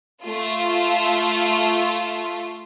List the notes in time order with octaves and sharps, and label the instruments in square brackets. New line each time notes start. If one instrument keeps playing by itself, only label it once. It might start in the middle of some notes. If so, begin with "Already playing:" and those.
[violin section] A3 F4